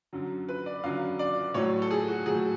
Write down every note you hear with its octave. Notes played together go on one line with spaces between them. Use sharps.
F#2 D3 F#3
B4
D5
F#2 D3 F#3 F5
D5
A2 F#3 C#5
A4
G#4
F#4
A2 F#3 G#4